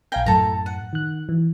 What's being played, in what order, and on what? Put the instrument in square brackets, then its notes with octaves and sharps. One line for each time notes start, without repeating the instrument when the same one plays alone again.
[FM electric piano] A#1 F5 G6 [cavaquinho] G5 G#5 A#5
[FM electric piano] F#2 A2 A6 [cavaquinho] A4 A#5
[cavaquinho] F#5
[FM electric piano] D#3 F#6
E3